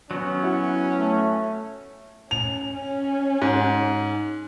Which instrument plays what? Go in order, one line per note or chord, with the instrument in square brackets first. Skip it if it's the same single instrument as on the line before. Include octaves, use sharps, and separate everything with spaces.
[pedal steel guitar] F#3 B3 [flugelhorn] C#4
[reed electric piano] E4 F#4 F#5
[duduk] A3
[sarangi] C#4 [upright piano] F7
[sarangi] C#4
[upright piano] G#2